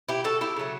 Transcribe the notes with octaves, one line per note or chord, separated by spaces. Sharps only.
E4 G4
F#4 A4
E4 G4
C#3 F#3 A3